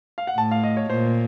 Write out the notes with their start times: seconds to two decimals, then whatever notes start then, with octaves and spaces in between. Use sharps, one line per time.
0.18 F5
0.27 F#5
0.37 A2 A5
0.51 F5
0.63 D#5
0.77 C#5
0.90 A#2 C5